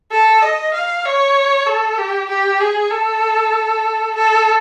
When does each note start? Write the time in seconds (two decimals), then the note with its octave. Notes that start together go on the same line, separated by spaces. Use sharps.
0.12 A4
0.42 D#5
0.74 F5
1.05 C#5
1.67 A4
1.98 G4
2.29 G4
2.61 G#4
2.91 A4
4.16 A4